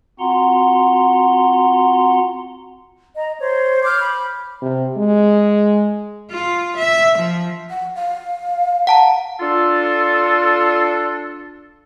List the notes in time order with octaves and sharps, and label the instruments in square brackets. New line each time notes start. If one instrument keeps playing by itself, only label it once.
[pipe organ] C4 F4 F#4 F#5 A#5 C6
[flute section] D#5 A#5
C5 C#5
D6 F6 G6
B5
[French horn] C3
G#3
[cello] F4
E5
F3
[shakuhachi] F#5
F5
[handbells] F#5 A5 A#5
[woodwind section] D4 F4 A4